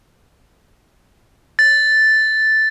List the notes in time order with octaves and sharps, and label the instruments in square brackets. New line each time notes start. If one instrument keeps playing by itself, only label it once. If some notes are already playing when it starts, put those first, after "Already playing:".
[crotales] A6